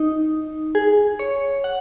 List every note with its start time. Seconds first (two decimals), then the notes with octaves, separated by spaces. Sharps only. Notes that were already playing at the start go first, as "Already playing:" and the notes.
Already playing: D#4
0.75 G#4
1.19 C#5
1.64 F#5